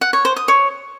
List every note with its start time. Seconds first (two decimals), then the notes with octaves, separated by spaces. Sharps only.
0.01 F#5
0.13 C#5
0.25 C5
0.36 D#6
0.48 C#5